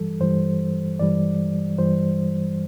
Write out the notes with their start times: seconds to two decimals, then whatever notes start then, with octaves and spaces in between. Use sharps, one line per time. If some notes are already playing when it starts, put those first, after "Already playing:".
Already playing: G2 E3 G3 A4
0.20 G2 E3 G3 C5
0.99 G2 E3 G3 D5
1.78 G2 E3 G3 C5